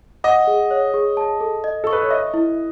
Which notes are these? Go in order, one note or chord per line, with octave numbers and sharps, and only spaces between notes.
D#5 F#5
G#4
C#5
G#4
A5
A4
D#5
A4 C#6
B4
C#5
D#5 E5
E4